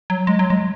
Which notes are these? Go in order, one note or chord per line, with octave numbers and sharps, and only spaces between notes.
F#3
G#3
F#3
G#3